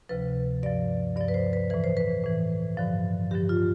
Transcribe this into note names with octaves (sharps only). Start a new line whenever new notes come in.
D2 C3 F3 B4
G2 F3 D5
G2 F3 D5
B4
C5
B4
A2 E3 B4
C5
B4
A2 E3
G2 D3 F3
G2 D3 F3 G4
F4